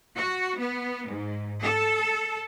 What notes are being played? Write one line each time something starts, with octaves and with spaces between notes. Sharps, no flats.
F#4
B3
G#2
A4